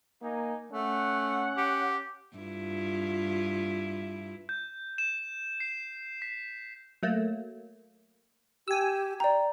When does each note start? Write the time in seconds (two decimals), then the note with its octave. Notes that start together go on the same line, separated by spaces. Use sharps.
0.22 A#3 D#4 G#5
0.72 A3 C#4 F#5
1.57 G4
2.37 G2 E4 F4
4.49 G6
4.98 E7
5.60 C7
6.22 B6
7.03 F#3 A3 A#3
8.68 G4 G#5 E6
9.20 D5 G5 A#5